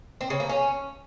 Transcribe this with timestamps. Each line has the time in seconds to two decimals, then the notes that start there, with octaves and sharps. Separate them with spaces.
0.21 C4
0.30 C#3
0.40 A#3
0.49 C#4